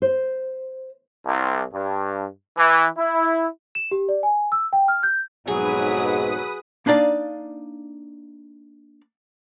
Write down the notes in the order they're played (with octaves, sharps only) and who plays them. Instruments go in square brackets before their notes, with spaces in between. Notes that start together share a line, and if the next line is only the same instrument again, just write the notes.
[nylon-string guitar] C5
[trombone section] C2
G2
E3
E4
[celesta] E7
G4
D5
G#5
E6
G5
F6
G6
[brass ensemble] B1 F2 G#2 [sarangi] F#3 [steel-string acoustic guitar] G#4 [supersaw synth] B4 D#6
[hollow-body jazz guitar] A#3 D4 D#4 D5 F5